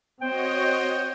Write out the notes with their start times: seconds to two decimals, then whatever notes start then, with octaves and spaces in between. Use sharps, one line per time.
0.21 C4 F#4 C5 C#5 D#5 G5